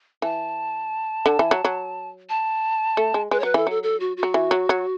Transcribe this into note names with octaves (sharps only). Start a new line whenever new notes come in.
E3 A5
D3
E3
F#3
F#3
A5
A3
G#3
G#3 B4
C#5
F#3 B4
E3 A4
F#3 A4
A4
F#4
F#4
F#3
E3
F#3
F#3